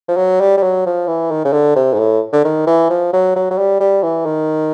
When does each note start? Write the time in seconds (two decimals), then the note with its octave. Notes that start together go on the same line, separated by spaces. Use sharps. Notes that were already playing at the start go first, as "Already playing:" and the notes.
0.08 F3
0.17 F#3
0.40 G3
0.57 G3
0.63 F#3
0.86 F3
1.07 E3
1.31 D#3
1.45 C#3
1.53 D3
1.76 C3
1.94 G#2
1.99 A2
2.33 D3
2.45 D#3
2.67 E3
2.90 F3
3.13 F#3
3.36 F#3
3.51 F#3
3.58 G3
3.80 G3
4.03 E3
4.25 D#3